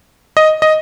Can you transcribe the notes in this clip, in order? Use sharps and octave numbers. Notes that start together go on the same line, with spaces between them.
D#5
D#5